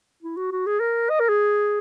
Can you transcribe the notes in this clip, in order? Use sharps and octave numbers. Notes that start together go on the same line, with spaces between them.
E4
F#4
F#4
G#4
A#4
D#5
A#4
G#4